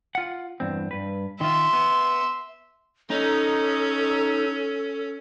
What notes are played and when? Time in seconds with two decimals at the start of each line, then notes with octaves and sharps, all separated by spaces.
0.15 F4 F#5
0.60 E2 G2 C4
0.91 G2 B4
1.41 D#3 F4 E5 C6
1.73 B3
3.10 C#4 D#4 A4